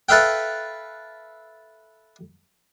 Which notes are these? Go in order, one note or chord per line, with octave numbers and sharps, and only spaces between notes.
A4 B4 E5 F5 G5